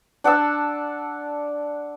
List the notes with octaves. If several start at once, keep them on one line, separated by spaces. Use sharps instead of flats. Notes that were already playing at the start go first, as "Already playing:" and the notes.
D4 F#5 A5 E6